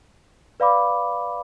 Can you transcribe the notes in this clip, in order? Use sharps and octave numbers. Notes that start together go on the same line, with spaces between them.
B4 D5 F5 B5 D6